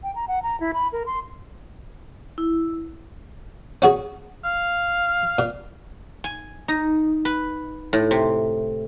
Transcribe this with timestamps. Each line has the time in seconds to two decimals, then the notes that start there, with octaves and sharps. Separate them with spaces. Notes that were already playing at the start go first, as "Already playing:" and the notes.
0.03 G5
0.15 A#5
0.28 F#5
0.43 A#5
0.60 E4
0.74 B5
0.92 A#4
1.06 C6
2.38 E4
3.82 C#4 F#4 G#4
4.44 F5
5.39 A#2
6.24 G#5
6.68 D#4
7.25 B4
7.93 A2
8.11 C3